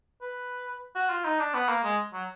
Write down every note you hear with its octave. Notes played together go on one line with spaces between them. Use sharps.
B4
F#4
F4
D#4
D4
B3
A#3
G#3
F#3